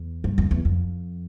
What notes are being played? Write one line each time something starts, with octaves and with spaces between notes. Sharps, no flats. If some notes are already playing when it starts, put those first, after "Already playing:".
Already playing: E2
G2
F2
E2
F2